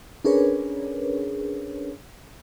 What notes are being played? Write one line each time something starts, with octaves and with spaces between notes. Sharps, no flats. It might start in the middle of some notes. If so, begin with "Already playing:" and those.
C#4 D4 G#4 A#4 B4 C#5